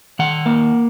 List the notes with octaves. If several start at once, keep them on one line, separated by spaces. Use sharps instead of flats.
D#3 F#5
A#3